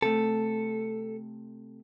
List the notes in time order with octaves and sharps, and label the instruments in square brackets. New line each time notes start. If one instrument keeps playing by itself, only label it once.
[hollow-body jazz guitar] C3 A3 [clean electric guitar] A4